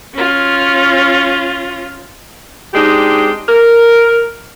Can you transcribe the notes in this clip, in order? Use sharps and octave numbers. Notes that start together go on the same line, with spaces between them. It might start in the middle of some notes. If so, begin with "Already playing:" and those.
C#4 F4
G#3 C4 D4 D#4 G4
A#4